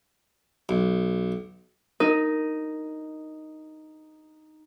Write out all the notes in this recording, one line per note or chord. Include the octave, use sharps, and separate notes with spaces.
B1
D#4 A#4